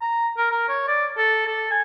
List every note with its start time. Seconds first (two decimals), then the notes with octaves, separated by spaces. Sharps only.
0.01 A#5
0.37 A#4
0.52 A#4
0.69 C#5
0.88 D5
1.18 A4
1.47 A4
1.71 G#5